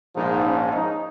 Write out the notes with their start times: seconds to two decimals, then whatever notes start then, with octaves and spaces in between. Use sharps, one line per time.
0.16 A#1 G#2 F3 D#4
0.45 C#4
0.73 D#4